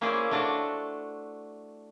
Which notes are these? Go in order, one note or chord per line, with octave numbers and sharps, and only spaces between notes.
A#3 C#4 E4 G#4 C5 D5
A3 D4 F#4 D5 F#5 A5